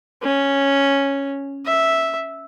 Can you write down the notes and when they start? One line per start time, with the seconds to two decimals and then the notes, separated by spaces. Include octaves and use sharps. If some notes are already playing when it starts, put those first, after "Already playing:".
0.23 C#4
1.66 E5